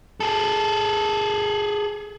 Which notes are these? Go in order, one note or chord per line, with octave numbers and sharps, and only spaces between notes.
G#4 A4